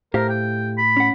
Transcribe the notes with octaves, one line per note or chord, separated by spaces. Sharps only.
A2 G4 A#4 C5 F5
G5
B5
C#4 F#5